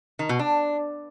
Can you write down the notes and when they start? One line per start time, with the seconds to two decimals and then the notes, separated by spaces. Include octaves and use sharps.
0.19 D#3
0.29 B2
0.39 D4